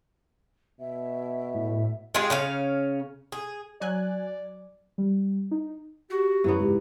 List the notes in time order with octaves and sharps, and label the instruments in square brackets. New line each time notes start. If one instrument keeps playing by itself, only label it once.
[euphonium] B2 [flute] E5
[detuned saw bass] A2
[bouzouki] G#3 F4 G4 G#4
C#3 C#4 F5
G#4
[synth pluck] F#3 G#5 F#6 [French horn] D5
[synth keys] G3
D#4
[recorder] F#4 [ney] G4
[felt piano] F#2 [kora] E3 F#3 B3
[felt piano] C#2 G#2 [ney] G4